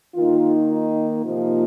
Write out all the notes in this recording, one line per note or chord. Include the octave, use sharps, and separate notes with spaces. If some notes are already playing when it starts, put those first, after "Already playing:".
D#3 A#3 D#4 F4
D#4
C3 F3 A#3 D#4 F4